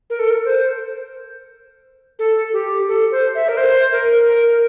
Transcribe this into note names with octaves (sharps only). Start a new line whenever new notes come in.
A#4
A4
A#4
C5
A4
G4
A4
C5
E5
A#4
C5
A#4
A#4